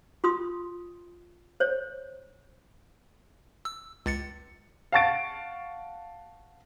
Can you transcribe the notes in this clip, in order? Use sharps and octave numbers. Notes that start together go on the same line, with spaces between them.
F4 B5 C6 D#6
C5 C#5
E6
C#2 A6 C#7
F5 F#5 A5 C#6 A6 D7